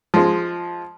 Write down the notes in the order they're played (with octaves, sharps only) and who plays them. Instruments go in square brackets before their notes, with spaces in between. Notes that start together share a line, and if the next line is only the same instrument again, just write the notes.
[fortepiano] F3 G#3